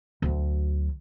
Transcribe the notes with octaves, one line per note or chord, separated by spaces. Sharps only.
D2 F#3